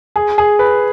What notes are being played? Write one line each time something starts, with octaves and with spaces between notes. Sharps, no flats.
G#4
G#4
B4